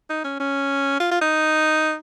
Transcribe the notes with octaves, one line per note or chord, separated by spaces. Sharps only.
D#4
C#4
C#4
F4
F4
D#4